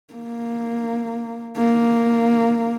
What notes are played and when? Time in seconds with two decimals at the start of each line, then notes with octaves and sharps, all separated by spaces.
0.14 A#3
1.57 A#3